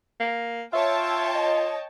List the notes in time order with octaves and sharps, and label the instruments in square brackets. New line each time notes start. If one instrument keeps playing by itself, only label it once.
[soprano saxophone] A#3
[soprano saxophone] F4 [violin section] C#5 G5 A5 [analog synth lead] E5
[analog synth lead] D#5